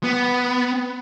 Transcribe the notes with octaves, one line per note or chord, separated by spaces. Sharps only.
B3